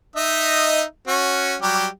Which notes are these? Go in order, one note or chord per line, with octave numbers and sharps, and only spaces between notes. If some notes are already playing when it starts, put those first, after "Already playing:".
D#4 D#5 E5
C#4 F#4
F#3 G3 G4